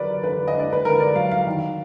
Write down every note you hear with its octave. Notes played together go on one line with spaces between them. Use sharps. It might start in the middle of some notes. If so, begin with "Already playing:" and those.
Already playing: D3 F#3 A#4 B4 D5
D3 B4
D#5
D4
D5
B4
D3 A#4
D5
F#3 F5
F5
D#3